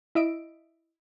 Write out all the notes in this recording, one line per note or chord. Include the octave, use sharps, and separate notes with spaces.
E4 D#5 E5 D7